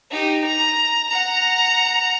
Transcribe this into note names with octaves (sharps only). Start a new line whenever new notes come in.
D#4 G4
A#5
F#5 A#5